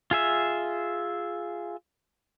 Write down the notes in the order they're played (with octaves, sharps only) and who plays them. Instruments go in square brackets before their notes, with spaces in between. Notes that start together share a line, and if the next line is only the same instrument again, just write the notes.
[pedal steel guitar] F4 G#4 E5